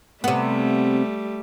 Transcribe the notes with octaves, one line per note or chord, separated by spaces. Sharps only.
C3 G3 A3 B3